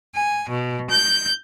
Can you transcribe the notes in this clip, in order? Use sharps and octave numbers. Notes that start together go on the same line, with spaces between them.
G#5
B2
G6